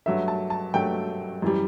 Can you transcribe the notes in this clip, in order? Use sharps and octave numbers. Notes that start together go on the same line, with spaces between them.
G2 F#3 A3 E5
A5
A5
G2 F#3 A3 G5
F#2 E3 G3